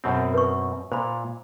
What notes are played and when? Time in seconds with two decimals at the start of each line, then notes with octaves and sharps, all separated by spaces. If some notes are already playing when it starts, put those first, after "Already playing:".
0.04 F#2 B2 C4
0.34 B4 C#6
0.92 A#2 C5 B5